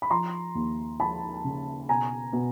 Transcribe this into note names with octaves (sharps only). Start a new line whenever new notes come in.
B5
F3 A#5 C6
D#2
F3 A5 B5
C#3
B2 G#5 A#5
B2